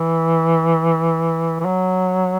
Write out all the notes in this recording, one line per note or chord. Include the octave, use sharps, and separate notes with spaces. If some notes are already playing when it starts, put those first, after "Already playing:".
Already playing: E3
E3
F#3